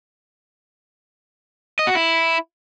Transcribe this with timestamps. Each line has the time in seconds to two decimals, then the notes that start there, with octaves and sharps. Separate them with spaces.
1.79 D#5
1.87 F#4
1.95 E4